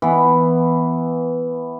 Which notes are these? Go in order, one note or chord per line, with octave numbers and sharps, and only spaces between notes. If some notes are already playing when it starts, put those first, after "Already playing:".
E3 B3